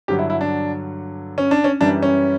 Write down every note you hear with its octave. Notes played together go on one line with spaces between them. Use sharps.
G2 D3 F#3 G4
E4
E4
D4
C#4
D4
C#4
F#2 E3 G3 D4
C#4